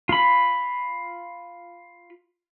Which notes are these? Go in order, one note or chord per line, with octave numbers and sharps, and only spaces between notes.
F4 B5